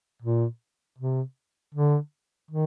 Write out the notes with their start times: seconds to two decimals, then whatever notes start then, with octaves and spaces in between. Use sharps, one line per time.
0.22 A#2
0.99 C3
1.74 D3
2.51 D#3